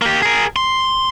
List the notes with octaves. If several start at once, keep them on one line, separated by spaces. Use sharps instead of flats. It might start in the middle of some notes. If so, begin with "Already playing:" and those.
A#3 G4
G#4 A#4
C6